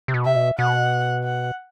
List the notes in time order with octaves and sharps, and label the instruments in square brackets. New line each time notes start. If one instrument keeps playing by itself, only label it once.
[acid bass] C3
B2
[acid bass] C3 [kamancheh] E5
[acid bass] B2
[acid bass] B2 [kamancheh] F#5
[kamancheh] F#5